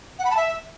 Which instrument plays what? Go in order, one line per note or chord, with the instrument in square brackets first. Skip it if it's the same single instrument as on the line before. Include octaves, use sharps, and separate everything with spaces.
[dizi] F#5
B5
A5
E5